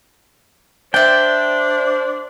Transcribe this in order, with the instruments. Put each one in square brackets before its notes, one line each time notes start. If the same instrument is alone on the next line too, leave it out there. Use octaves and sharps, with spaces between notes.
[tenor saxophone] D4 [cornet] C5 [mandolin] D5 E5 [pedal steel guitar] G5